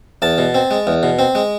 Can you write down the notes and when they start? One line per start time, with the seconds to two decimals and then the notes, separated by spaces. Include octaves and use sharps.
0.22 E2 A5
0.38 B2
0.55 C4
0.71 G#3
0.87 E2
1.03 B2
1.19 C4
1.35 G#3